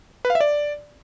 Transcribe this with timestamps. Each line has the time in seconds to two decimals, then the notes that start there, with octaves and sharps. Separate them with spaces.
0.25 B4
0.30 F5
0.35 E5
0.40 D5